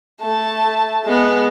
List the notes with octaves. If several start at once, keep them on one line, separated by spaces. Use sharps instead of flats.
A3 A5
G#3 B3